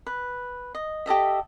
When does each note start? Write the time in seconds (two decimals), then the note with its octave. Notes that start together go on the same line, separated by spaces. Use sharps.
0.06 B4
0.75 D#5
1.06 G4 A4 D#5 E5